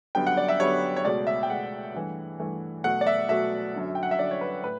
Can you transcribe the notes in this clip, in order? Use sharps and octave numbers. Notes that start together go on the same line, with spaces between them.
F#2 D3 G3 B3 G5
F#5
D5
E5
F#2 D3 G3 B3 C#5
C#5
C#2 B2 A3 D5
E5
G5
C#2 B2 A3 F#5
G2 E3 A3
G2 E3 A3
B2 F#3 A3 F#5
D5
E5
B2 F#3 A3 E5
F#2 D3 F#3
G5
F#5
E5
F#2 D3 F#3 D5
C#5
B4
A2 B4